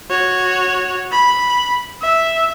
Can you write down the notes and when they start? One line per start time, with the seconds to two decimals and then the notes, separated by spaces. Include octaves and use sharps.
0.10 F#4 C#5
1.12 B5
2.02 E5